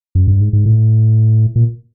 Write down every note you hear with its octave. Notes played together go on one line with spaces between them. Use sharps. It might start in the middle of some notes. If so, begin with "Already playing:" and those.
F#2
G2
G#2
G#2
A2
A#2